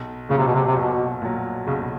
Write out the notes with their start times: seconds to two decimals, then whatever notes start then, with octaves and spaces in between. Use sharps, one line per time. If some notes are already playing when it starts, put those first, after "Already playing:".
Already playing: B1
0.29 A#2 C#3
0.34 C3 F#3
0.47 B2
0.55 C3
0.67 C3
0.76 B1 B2
1.22 A#2 F#3
1.67 B1 C#3